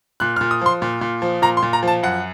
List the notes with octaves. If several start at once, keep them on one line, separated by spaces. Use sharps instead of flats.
A#2 F#6
F6
A#2
D#6
F3 C6
A#2
A#2
F3
A#2 A#5
C6
A#2
A#5
F3 A5
F#2 F#5